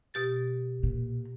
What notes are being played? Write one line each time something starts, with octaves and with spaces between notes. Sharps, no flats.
B2 G4 A6
A#2